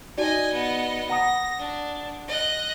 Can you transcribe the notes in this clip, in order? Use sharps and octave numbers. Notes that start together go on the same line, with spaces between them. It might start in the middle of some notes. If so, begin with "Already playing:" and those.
D#4 F#4 D5 D#5 G#5
B3 D#5
F#5 A#5 D#6 A#6
D4
D#5 F#6